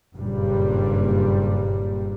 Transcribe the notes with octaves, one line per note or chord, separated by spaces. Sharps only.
F#1 G2 A#2 G3